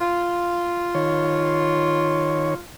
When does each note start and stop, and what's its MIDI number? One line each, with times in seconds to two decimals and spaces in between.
0.01 2.61 65
0.95 2.54 51
0.95 2.54 73